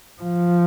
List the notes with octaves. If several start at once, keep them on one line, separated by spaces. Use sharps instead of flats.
F3